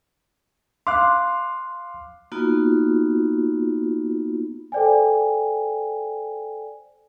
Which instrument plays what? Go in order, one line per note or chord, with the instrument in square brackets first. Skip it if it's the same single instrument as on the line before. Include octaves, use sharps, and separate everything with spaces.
[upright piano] F5 D6 [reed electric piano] C6 F#6
[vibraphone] A#3 B3 D#4 F4 F#4
[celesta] A4 C5 D5 G5 G#5